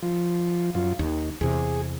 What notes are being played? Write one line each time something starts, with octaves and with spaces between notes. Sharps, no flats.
F3
F#2 F4
D#2 D#3
E2 C3 G#4